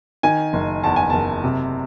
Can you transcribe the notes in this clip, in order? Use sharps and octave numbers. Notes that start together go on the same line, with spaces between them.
D#3 G#5
F#1
E2 A5
G#5
F#1 A5
C3